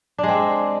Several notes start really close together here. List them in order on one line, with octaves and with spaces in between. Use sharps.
D4 G#3 C4